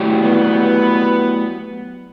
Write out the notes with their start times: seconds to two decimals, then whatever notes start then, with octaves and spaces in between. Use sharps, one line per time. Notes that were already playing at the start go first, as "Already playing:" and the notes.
Already playing: F#3 A3 E4 G4 D5
0.20 B3